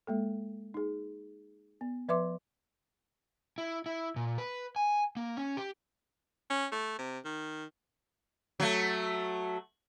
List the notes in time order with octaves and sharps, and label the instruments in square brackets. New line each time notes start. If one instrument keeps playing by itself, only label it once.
[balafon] G#3 A#3 A4
D#4 G#4
B3
F3 B4 E5 C6 D6
[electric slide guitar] E4
E4
A#2
B4
G#5
A#3
C#4
G4
[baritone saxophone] C#4
A3
C3
D#3
[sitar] F#3 A3